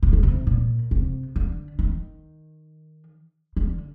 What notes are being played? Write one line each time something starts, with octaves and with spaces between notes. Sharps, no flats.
C3
C#3
C3
A#2
C3
D3
D#3
D3